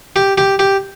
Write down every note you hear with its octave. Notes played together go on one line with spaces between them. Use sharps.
G4
G4
G4